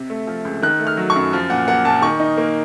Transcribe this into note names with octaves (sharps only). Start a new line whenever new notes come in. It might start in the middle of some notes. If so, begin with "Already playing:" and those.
Already playing: C3
A3
F3
C#2
D#3 F#6
A3
F6
F#3
C#6
F#2
F3
A#2 F#5
A#3 F#5
A#2 A5
D#3 C#6
D#4
A#3